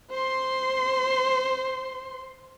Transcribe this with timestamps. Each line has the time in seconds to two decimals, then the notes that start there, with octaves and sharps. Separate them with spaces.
0.10 C5 C6